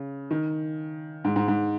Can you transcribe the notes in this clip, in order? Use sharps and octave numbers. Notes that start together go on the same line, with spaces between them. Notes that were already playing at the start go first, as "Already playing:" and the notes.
Already playing: C#3
D#3
G#2
G#2
G#2